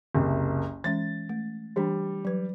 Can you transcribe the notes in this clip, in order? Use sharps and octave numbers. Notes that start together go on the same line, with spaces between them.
F#1 C2
E3 G#3 C#4 A6
A3
E3 G3 D4
F#3 B4